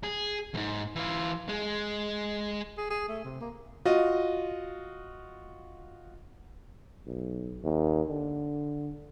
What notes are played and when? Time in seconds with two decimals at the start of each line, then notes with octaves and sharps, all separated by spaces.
0.03 G#4
0.54 F2 G#2
0.96 E3 F4
1.49 G#3
2.77 G#4
2.90 G#4
3.08 A3
3.24 C3
3.41 A#3
3.85 F4 F#4 D#5
7.07 B1
7.63 D#2
8.08 D3